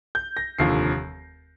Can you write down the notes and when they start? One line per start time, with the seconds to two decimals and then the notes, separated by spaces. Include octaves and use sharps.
0.15 G6
0.37 A#6
0.59 F1 D#2 D3 F3 C7